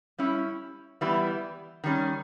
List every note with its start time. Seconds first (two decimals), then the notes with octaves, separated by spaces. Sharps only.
0.18 G3 C#4 E4
1.01 E3 G3 B3 E4
1.84 D#3 G3 C#4